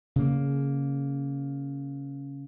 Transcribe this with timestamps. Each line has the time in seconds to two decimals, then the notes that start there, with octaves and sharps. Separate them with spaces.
0.16 C#3 A#3